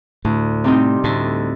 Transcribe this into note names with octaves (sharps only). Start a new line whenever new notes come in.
D2 A2
C3 G3 C4 D#4
D2 A2